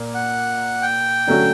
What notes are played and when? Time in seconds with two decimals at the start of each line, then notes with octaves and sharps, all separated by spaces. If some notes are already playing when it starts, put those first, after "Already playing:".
Already playing: A#2 A#3
0.15 F#5
0.82 G5
1.27 D3 F#3 A3 C#4 F#4